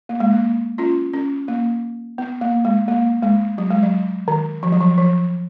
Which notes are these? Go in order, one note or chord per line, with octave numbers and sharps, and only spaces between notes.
A#3
G#3
A#3
C#4 F4
C#4
A#3
B3
A#3
G#3
A#3
G#3
F#3
G#3
F#3
D#3
F3
F#3
F3
F3